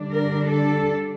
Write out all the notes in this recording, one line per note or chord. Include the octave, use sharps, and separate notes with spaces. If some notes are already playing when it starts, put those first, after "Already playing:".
Already playing: D3 G3 D4
A#4
A4